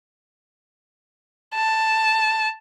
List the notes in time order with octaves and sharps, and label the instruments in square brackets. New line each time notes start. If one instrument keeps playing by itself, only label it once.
[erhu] A5